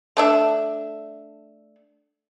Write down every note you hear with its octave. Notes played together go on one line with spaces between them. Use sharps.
A3 D4 E5